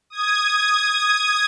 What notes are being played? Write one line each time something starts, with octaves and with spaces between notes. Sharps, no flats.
D#6 G#6